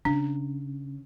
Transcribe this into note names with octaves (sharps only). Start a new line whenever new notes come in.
C#3 D4